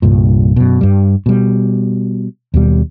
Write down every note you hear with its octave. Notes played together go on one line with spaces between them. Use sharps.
C2 G2 A#2
F#2 B2
G2 G3
B2 G3
D#2 B2 G3